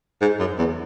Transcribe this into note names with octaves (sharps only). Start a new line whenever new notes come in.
G#2
F#2
E2